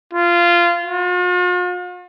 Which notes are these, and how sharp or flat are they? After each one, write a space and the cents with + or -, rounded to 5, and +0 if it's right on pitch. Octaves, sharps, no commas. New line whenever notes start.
F4 -15
F4 +45